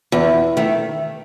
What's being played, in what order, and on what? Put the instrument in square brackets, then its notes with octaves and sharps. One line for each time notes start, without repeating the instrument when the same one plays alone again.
[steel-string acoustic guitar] E2
D#3 A3